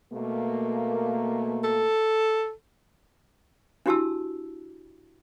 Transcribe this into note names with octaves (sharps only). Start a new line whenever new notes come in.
B2 A3 A#3
A4
D4 E4 F#4 G4 A5 E6